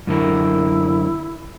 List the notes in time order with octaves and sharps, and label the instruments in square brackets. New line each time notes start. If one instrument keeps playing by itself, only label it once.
[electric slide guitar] F#2 D3 A#4 [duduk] E4